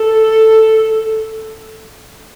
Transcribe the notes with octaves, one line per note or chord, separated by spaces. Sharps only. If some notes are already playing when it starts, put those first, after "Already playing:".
Already playing: A4